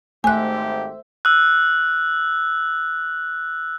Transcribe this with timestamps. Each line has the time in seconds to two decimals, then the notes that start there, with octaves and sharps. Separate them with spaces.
0.24 G#1 G#2 A3 G4 C5 E5 G#5 F#6
1.25 E6 F#6